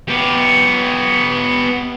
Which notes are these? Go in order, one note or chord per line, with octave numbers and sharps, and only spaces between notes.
B3 G4